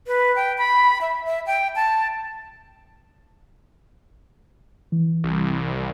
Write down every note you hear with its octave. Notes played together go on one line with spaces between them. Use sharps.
B4
G5
B5
E5
E5
G5
A5
E3
C2